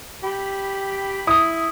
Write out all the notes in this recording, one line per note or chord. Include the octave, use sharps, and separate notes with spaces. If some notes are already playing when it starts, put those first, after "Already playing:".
G4 B5
E4 D#6